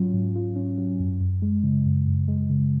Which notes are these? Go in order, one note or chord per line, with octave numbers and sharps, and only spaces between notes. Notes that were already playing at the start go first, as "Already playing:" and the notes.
Already playing: G#2 F#3 C#4 F4
G#2
F4
C#4
F#3
F#2
F#2
G#3
C#3
F#2
F#2
G#3
C#3